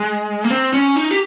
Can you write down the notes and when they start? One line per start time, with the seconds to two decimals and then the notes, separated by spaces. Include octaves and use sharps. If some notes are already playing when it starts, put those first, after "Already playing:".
Already playing: G#3
0.44 A#3
0.51 C4
0.73 C#4
0.96 D#4
1.11 G4